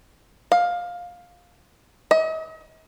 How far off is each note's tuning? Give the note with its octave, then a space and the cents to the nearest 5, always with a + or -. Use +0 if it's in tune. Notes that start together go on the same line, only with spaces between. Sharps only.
F5 +15
D#5 +40